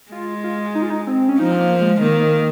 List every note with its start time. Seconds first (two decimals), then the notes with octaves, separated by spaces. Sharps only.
0.11 G#3 F4
0.44 F4
0.75 D#4
0.82 F4
0.90 D#4
1.07 C4
1.29 C#4
1.39 F3 D#4
1.52 C4
1.60 A#3
1.81 G#3
2.01 D#3 A#3
2.23 A#3